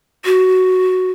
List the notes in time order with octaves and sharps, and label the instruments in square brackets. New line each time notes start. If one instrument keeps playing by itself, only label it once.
[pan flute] F#4